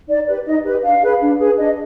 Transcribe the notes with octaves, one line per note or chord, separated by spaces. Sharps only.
D#4 D5
G4 B4
D#4 D#5
G4 B4
D4 F5
G#4 B4
D4
G#4 B4
D4 D#5